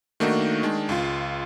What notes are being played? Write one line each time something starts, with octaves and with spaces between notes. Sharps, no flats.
D#3 A3 A#3 D4 D#4 F#4
D#3 G#3 D4
C#2 F4